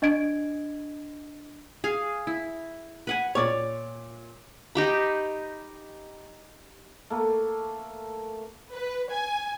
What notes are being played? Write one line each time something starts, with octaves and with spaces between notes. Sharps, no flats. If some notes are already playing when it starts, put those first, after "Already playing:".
D4 D#5 G#6 D7
G#4 F5
E4
B4 F#5 G#5
A#2 C#5 D5 D6
D#4 G4 B5
A3 A#3
B4
G#5